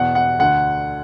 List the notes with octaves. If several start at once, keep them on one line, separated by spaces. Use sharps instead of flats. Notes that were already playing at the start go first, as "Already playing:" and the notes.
Already playing: E2 B2 F#5
F#5
D2 D3 F#5